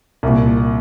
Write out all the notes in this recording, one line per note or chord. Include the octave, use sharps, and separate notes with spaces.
C2 A#2